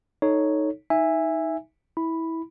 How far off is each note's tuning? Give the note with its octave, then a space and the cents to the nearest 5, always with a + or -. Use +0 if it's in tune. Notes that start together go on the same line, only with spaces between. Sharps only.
D#4 +0 A4 +0 C#5 +0
D#4 +20 E5 +0 G#5 -15
E4 -20 B5 +0